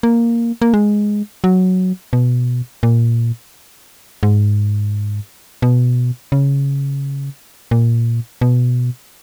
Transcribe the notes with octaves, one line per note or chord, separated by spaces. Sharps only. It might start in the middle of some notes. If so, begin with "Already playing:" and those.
A#3
A#3
G#3
F#3
B2
A#2
G#2
B2
C#3
A#2
B2